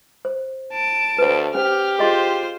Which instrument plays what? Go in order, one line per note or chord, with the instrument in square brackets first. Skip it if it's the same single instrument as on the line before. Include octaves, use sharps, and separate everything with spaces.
[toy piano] C5
[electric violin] A5 D7
[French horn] D2 [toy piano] B4 C5
[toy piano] C#4 C5 [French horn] G4 [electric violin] F6
[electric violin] F4 C5 [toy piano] G#4 D#5 C6